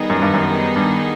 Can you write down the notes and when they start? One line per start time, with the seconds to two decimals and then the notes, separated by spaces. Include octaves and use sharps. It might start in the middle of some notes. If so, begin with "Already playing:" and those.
Already playing: D#3 G3 B3 D#4 G#4
0.10 F#2
0.22 G2
0.34 F#2
0.76 G2